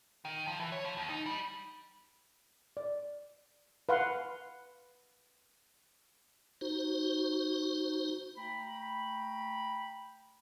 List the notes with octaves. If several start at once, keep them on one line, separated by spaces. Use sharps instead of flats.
D#3
F3
E3
C#5
F3
D#2
D#4
G3
D5
B4 F5 F#5 C6
D#4 F#4 C5
A3 G5 A#5 B5